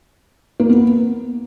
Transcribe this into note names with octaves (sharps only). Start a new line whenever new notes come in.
A#3
B3